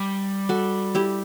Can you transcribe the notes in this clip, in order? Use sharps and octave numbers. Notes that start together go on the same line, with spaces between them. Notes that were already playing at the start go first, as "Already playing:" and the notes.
Already playing: G3
F#4 A4
E4 G4